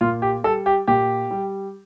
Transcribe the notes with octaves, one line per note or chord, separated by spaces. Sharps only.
A#2 F4
G4
G3 A4
G4
A#2 G4
G3